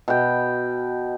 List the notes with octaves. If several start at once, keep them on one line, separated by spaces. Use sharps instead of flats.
B2 G5